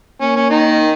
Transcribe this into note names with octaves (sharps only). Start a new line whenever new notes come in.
A#3 C#4
C#4
D#3 D#4